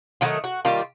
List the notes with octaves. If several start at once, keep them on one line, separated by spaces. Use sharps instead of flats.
D#3 F#3 A3 F4
F#4
D#3 G3 A#3 F4